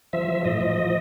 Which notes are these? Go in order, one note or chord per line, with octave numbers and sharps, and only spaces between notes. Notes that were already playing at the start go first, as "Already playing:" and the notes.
F3 E5
F3
A2 D#5
F3
F3